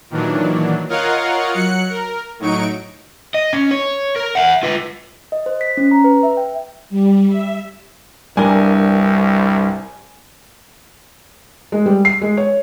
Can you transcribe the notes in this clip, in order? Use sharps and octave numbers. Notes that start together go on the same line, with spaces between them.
A#2 D#3 E3 F#3 D4
F4 A#4 C#5 D#5 F5 F#5
F#3 F#6 C#7
A#4
A2 F#3 D#4 C#6 D7
D#5
C#4
C#5
A#4
E5 F#5
F4 B4
D#5
C5
B6
C#4
A#5
B4
E5
G5
G3
E5
C2 G2 D4 A#4 G#5
G#3
G3
C7
G#3
C#5